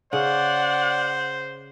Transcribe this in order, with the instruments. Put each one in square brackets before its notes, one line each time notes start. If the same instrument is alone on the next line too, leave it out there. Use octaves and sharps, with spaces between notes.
[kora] C#3 [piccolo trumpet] C5 [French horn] D5 [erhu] F#5